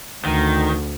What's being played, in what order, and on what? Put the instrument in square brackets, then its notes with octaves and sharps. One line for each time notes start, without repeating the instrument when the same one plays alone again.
[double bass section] D2 [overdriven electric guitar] D#3